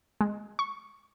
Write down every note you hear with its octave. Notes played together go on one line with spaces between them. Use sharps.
G#3
C#6